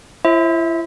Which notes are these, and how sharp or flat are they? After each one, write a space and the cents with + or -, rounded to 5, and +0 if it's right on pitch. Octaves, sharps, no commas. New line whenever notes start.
E4 +35 C5 +40 E5 -25